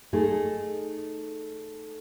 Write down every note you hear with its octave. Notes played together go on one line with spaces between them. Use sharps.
A3 D#4 G#4 A4